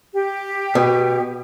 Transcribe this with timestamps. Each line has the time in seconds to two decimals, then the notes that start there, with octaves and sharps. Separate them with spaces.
0.13 G4
0.75 B2